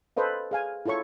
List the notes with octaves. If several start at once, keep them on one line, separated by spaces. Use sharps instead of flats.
A4 B4 C5 D#5 F5
G#4 F5 G#5
E4 F4 A4 C#5 C#6